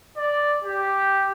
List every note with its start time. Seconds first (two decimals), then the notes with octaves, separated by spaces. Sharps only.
0.17 D5
0.64 G4